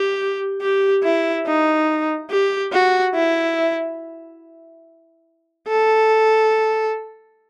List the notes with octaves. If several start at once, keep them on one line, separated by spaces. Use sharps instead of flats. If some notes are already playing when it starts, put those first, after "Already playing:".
Already playing: G4
G4
E4
D#4
G4
F#4
E4
A4